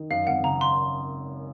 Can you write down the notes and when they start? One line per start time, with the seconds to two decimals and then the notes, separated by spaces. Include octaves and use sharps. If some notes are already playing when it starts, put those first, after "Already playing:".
Already playing: D#3
0.10 F#2 F5
0.27 G#1 F#5
0.43 C#3 A#5
0.61 C6